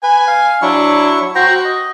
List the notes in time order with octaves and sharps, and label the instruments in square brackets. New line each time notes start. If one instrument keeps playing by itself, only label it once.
[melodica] B4 [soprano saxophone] G#5
[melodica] F5
[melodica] F#3 E4 C#6 [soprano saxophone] D4
[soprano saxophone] F#4 [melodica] C5 G5 A#5
[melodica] D#5